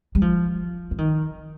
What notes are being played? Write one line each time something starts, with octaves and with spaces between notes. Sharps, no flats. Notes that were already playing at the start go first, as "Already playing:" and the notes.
G3
F3
F3
D#3